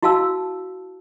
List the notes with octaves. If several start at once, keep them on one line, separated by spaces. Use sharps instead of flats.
E4 F#4 F5 A5 E6